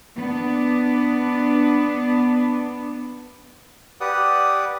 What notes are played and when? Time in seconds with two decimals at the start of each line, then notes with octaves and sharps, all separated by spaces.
0.16 B3 D4
4.01 G4 B4 D5 F#5 D#6